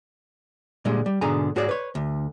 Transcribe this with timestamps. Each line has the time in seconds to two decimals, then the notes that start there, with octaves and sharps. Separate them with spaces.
0.85 A#2 D3 G3 G#3
1.06 G3
1.21 G#2 B2 D3 G#4 G#5 A#5
1.56 G#2 F#4 G#4 C#5 D5
1.69 B4 C#5
1.95 D2